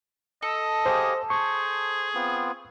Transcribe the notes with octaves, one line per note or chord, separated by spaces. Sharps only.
A4 D#5
G4 G#4 C5 F5
G#4 C5 C#6
B3 C4 F4